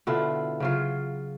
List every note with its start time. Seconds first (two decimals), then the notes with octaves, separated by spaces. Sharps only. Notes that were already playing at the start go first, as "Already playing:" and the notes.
0.07 B2 D3 E4 F4
0.60 C#3 F#3 F4